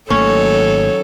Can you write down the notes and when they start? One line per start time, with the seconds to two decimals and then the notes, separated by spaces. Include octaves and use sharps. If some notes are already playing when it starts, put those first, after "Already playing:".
0.10 G#1 D#3 F#3 A3 A#3 C#4 A4 C#5